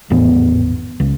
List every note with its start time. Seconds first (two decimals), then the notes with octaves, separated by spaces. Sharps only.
0.10 G#1 E2 A2 B3
1.00 C#2